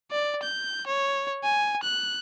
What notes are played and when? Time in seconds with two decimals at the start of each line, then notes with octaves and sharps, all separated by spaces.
0.11 D5
0.43 G6
0.87 C#5
1.43 G#5
1.83 F#6